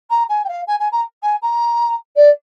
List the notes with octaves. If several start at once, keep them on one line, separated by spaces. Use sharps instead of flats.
A#5
G#5
G5
F5
G#5
G#5
A#5
G#5
A#5
D5